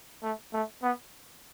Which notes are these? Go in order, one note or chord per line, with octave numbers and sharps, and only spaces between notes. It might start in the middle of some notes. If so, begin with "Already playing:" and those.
A3
A3
B3